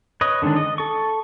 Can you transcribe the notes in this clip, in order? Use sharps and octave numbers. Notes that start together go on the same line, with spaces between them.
B4 C#5 D#5
D3 D#3 G#3 C#4 D4
D#5
A4 C#6